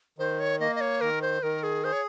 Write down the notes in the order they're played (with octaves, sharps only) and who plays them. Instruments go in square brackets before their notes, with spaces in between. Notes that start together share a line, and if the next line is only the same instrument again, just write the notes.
[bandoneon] D#3 [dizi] C5
[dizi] C#5
[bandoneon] A#3 [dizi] D#5
[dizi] D#5
C#5
[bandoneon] D#3 [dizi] A#4
[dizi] C5
[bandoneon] D#3 [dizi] A#4
[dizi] G#4
[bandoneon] G#4 [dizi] C5
[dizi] C#5